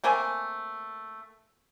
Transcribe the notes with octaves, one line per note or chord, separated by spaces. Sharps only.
A3 A#3 C4 G#5